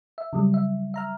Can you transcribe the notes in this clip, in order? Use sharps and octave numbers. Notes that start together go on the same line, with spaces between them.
E5
C#3 F#3 G3
E5
E5 A#5 F6